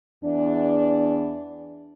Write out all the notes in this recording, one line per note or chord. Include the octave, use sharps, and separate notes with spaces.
E2 D4